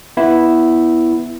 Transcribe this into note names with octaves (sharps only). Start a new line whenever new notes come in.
B3 E4